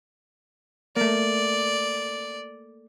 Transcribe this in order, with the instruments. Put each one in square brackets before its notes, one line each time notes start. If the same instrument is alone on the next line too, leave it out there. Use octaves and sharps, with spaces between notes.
[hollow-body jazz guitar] A3 A#3 [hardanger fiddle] D5